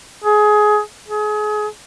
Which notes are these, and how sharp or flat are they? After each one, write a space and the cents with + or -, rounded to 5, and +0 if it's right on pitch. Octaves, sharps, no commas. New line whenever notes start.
G#4 +20
G#4 +30